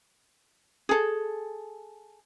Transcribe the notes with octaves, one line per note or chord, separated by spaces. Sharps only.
G#4 A4